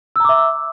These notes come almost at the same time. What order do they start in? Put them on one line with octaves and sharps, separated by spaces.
E6 A#5 D6 E5